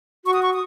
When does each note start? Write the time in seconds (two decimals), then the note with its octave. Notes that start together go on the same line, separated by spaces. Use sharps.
0.25 F#4 C#6
0.34 D#6
0.43 C#6
0.51 D#6